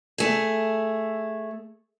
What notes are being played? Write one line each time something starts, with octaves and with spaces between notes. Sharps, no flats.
A3 G#4